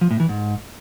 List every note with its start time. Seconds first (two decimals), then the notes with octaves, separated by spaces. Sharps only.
0.01 F3
0.11 A2
0.20 E3
0.29 G#2